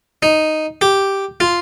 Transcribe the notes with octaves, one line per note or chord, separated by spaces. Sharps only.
D#4
G4
F4